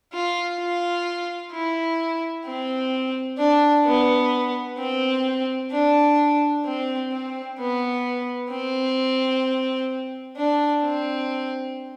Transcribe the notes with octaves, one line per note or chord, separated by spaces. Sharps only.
F4
F4
E4
C4
D4
B3
C4
D4
C4
C4
B3
C4
D4
C4